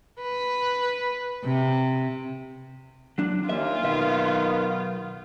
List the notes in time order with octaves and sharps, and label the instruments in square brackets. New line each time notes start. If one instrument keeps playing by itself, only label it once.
[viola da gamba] B4
C3
[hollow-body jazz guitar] F#3 D4
[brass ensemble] D#2 A#2 [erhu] F4 [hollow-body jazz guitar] E5
[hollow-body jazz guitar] B1 E5 [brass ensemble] D#3 B3